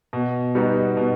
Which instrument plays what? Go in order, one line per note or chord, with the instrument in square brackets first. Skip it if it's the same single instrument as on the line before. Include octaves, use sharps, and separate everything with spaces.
[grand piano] B2
G3 B3 D#4 F#4
B2